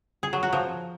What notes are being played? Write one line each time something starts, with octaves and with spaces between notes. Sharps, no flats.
G#4
F#3
F#4
F3